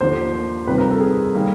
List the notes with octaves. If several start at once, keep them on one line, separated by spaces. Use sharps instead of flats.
D#2 D3 F3 C5
F2 C3 D#3 G3 C4 B4
A#4
A4
G#4
D#3 G3 A#3